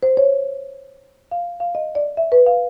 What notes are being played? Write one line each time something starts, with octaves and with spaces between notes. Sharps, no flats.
C5
C#5
F5
F5
D#5
D5
E5
B4
F5